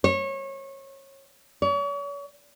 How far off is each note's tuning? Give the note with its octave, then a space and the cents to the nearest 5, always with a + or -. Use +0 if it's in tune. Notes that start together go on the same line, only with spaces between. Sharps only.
C#5 -30
C#5 +40